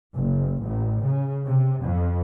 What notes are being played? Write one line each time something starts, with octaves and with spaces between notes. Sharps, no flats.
F#1
A1
C#3
C3
F2